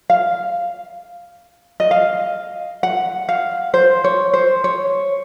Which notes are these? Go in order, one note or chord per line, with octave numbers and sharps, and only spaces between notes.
F5
D#5
F5
F#5
F5
C5
C#5
C5
C#5